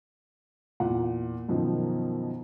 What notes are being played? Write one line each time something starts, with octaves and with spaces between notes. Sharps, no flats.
E2 A#2 F#5
F#2 B2 D#3 F3